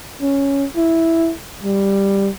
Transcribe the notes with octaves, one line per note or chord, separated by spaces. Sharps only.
C#4
E4
G3